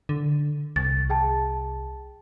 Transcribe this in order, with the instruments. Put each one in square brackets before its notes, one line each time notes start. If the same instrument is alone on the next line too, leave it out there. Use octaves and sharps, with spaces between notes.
[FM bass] D3
[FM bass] C2 [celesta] A6
[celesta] G#4 G5 A5